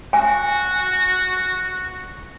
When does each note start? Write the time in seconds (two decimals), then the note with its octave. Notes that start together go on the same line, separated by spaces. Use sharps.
0.13 F#4 G#5